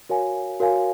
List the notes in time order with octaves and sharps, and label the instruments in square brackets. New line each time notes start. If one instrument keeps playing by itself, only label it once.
[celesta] F#4 A#4 C#5 F5 G#5
F#4 A#4 C#5 F5 G#5